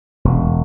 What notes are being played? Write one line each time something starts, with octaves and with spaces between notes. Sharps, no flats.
E1